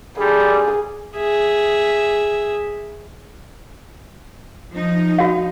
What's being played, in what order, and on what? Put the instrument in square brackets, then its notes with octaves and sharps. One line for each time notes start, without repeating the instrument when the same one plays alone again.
[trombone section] D3 G3 [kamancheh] G#4
[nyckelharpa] G#4 E5
[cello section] F3 D#4
[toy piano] F#4 F5